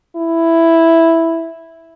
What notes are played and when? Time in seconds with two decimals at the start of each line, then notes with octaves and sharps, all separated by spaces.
0.16 E4